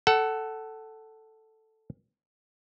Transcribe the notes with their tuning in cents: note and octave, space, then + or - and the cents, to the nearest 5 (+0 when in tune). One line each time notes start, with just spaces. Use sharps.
A4 +0 F#5 +20